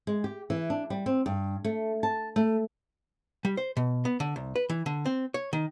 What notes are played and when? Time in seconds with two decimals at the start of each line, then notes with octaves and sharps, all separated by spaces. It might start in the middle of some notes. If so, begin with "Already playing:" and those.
0.07 G#3
0.24 G4
0.50 E3
0.70 D4
0.90 G3
1.06 C4
1.26 G2
1.64 A3
2.03 A5
2.36 A3
3.45 G3
3.57 C5
3.77 B2
4.05 B3
4.20 D3
4.36 C2
4.56 B4
4.69 E3
4.86 D3
5.06 C4
5.34 C#5
5.53 D#3